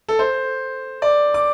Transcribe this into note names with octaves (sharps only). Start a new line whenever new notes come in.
A4
C5
D5
D6